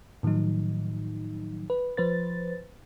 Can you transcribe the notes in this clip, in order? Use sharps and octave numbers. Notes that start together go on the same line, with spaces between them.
A2 D#3 F3 F#3 D#4
B4
F3 B4 C5 A6